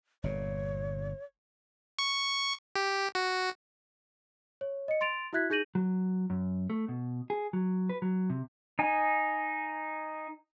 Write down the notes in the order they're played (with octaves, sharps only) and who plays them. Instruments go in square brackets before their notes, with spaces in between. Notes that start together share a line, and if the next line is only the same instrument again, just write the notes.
[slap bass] G1 A#2 [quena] C#5
[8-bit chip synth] C#6
G4
F#4
[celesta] C#5
D#5 C#7
C6 A6 D7 F7
E4 F#4 E5 F#6 G#6 B6
D#4 G#4 G6 A#6 D#7 F#7
[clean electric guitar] F#3
F#2
A3
B2
G#4
F#3
B4
F#3
C3
[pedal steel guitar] D#4 G#5